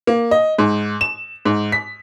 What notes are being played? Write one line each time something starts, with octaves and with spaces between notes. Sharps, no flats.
A#3
D#5
G#2
E7
G#2
B6